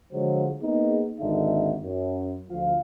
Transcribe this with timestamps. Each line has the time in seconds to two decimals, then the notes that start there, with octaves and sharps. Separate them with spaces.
0.13 D3 F3 F#3 G#3 C5
0.63 A#3 B3 D#4 G#4
1.21 G#1 D#2 D3 D#4 E5
1.83 F#2
2.50 D2 F3 F4 F5